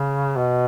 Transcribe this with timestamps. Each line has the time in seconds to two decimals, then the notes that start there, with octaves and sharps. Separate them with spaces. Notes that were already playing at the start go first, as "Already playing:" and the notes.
Already playing: C#3
0.37 B2